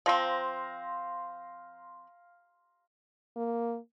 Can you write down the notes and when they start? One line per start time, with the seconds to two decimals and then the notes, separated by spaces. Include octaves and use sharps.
0.06 F3 C4 F5 A#5 C6
3.37 A#3